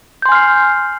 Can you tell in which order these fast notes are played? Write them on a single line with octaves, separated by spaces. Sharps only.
G6 C6 G#5 F6 C7